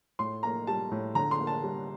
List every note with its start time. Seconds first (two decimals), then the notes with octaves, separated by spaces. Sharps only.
0.19 A2 C6
0.43 A#3 A#5
0.67 G3 A5
0.91 A2
1.15 D3 A#5
1.31 C6
1.40 A#3
1.47 A5
1.64 G3